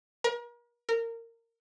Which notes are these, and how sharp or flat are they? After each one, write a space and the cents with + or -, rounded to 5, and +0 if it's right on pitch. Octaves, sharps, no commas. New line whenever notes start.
A#4 +40
A#4 -20